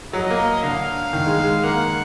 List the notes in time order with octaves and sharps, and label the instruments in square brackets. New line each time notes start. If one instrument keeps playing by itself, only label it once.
[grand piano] F#3 [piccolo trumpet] D#5
[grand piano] A#3
[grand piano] D3 [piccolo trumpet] F5
[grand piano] D#3
G#3
G#3
[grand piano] A#3 [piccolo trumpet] F#5